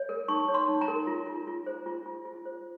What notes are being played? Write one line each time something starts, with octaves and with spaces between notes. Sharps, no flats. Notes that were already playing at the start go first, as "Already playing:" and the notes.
Already playing: C#5
A#4
D#4 C#6
C#5
C6
D#4
A#5
A#4
F4
F4
F4
C5
F4
F4
F4
C5